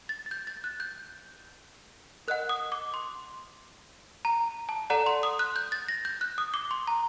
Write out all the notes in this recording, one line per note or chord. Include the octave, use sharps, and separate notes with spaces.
A6
A6
G6
A6
F#6
G6
A#4 D#5 F#5 F#6
D#6
D6
C6
A#5
A5
A4 D5 F#5 A#5
C6
D#6
F#6
G6
A6
A#6
G6
F#6
D#6
D6
C6
A#5